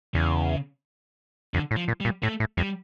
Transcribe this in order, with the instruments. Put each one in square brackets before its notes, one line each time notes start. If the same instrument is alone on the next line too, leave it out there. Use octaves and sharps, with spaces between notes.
[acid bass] E2 [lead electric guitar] C#3
[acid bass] F2 [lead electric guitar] D3
[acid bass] A2
[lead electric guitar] F3
[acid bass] A#2
[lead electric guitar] G3
[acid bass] A#2
[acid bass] A2 [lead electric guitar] A3
[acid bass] A2
[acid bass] F2 [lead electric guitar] G3